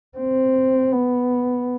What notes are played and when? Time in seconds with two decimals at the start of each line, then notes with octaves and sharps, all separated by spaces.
0.18 C4
0.92 B3